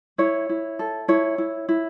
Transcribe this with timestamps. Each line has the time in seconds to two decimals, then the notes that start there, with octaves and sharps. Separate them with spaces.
0.18 E4 C#5
0.49 E4
0.79 A4
1.08 E4 C#5
1.38 E4
1.69 E4